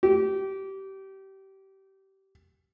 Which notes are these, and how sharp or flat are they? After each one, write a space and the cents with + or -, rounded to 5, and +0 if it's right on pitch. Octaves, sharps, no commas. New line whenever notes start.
G4 -25